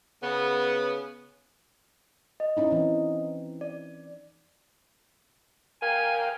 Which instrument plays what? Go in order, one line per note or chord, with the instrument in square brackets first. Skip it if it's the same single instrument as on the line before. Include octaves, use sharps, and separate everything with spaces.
[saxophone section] C#3 B3
[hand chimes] D#5
[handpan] C#4 D#4 E4
E3 C4 D#4
[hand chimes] D5
[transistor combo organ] A#4 F5 G5 [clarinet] G#5